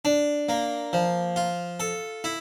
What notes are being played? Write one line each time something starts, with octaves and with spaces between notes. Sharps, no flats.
D4
A#3
F3
F4
A4
E4